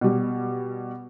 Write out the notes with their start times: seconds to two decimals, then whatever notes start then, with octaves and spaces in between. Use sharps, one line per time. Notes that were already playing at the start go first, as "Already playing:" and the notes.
0.01 B2 G3